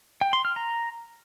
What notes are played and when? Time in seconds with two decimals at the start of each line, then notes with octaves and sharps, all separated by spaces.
0.21 G5
0.33 C6
0.45 F6
0.56 A#5